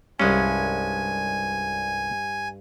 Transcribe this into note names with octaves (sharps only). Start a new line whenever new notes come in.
C2 G2 G#3 C#4 G#5